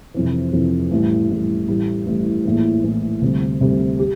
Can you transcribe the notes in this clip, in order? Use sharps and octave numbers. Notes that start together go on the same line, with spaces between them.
F2 C3 E3
F2 C3 E3
A1 A2 G3
A1 A2 G3
A1 A2 G3
A1 A2 G3
A#1 A2 E3
A#1 A2 E3
D2 C3 G3
D2 C3 G3
G4